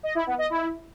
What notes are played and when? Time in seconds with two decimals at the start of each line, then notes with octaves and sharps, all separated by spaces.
0.03 D#5
0.15 E4
0.27 B3
0.38 D#5
0.50 E4